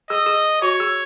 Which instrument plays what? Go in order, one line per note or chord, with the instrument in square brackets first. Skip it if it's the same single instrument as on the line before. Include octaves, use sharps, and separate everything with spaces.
[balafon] G#4 [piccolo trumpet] D#5
[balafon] G#4
[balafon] F#4 [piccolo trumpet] C#5
[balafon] G#4